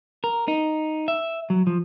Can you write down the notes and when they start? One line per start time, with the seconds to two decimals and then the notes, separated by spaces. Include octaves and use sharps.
0.24 A#4
0.48 D#4
1.08 E5
1.50 F#3
1.67 F3